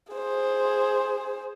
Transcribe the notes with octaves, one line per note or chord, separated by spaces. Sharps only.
G#4 C5